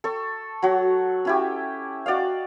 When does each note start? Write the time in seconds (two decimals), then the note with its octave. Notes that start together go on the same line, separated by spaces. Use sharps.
0.04 A4 C#6
0.63 F#3 F#4
1.25 C#4 E4 G4
2.06 F#4 D5 D#5 F5